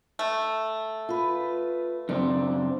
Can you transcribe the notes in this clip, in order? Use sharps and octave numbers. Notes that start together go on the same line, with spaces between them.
A3
F4 B4
F#2 C#3 C4 D4